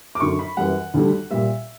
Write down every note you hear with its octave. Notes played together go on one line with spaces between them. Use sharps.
D6
F#2 D3 F#3 C#6
B5
F#2 E3 G3 F#5
D2 D3 G3
A#2 G3 E5